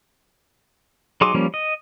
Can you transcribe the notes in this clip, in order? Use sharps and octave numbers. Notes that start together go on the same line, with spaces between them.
F#3 D#4 G#4 C6 D6
F3 G3 A#3 C#4
D#5